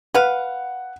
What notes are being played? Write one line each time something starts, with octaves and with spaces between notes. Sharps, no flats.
B4 F5 F#5